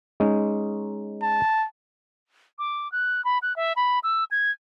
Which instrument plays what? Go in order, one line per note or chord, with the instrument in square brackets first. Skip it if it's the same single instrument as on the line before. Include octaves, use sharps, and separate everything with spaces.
[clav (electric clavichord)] G#3 C#4 D#4
[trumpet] A5
[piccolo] D6
F#6
B5
F#6
E5
B5
E6
G#6